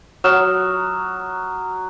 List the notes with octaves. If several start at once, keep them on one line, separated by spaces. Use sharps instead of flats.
F#3 D#6 F6 E7